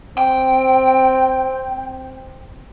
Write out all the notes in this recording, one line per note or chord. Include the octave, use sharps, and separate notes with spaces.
C4 G5